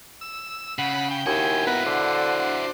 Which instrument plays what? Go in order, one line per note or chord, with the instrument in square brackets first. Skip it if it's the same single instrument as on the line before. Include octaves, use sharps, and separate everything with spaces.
[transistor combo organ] E6
[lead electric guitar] C#3 [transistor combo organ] F#5 B5
[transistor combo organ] G5
[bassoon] D#2 [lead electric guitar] E4 F#4 [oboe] G#5
[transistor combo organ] B3 A#4 B4 [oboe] F#5
[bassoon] D3 [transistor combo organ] D4 C5